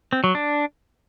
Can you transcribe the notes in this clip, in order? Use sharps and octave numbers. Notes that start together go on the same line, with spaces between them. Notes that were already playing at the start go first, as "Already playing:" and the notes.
C4
F#3
D4